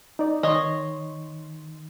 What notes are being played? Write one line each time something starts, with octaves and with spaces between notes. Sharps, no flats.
D#4 D5
D#3 C#5 D#5 C6